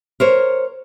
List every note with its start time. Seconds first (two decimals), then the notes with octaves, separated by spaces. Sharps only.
0.20 A#4 C5 C#5